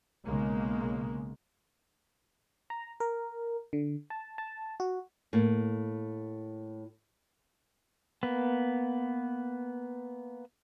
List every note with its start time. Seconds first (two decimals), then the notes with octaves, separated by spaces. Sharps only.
0.25 B1 C#3 G#3 A#3
2.70 A#5
3.00 A#4
3.73 D3
4.10 A5
4.38 A5
4.80 F#4
5.33 A2 A#3
8.23 A#3 B3